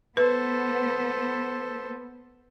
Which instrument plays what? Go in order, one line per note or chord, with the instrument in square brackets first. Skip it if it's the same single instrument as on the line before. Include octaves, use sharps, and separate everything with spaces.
[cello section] B3 [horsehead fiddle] A4 C5 [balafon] B4